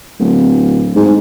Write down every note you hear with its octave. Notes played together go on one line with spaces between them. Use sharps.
D1
G#2